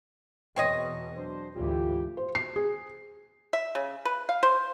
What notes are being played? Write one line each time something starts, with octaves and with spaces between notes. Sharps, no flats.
E2 B2 C4 C#5 D#5
F#3 D4 C5
D2 G#2 E3 F4 G4
C5
C7
G#4
E5
C#3
B4
F5
C5